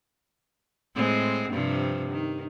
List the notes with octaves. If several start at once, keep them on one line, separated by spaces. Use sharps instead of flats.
A2 G#3 C4
G2 C3 F3
D#3